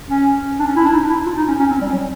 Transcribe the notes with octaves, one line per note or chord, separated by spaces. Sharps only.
C#4
D4
C#4
E4
D4
D#4
E4
F4
D#4
C#4
C#4
C4
G3
F#3